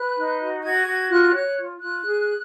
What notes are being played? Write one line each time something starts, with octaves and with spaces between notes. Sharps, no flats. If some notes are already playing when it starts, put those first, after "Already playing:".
Already playing: B4 F#6
D#4
F#4
F#4 G#6
F#4
F4 F#6
C#5 F#6
F4
F4 F#6
G#4